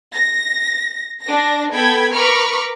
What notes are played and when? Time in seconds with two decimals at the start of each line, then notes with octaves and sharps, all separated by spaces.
0.13 A#6
1.22 D4 A#6
1.72 B3 A4 G5 B5 G#6
2.14 A#4 B4 B5 C#6 D6 F6